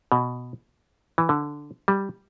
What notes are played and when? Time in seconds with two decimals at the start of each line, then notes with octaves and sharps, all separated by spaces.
0.12 B2
1.18 E3
1.29 D3
1.88 G3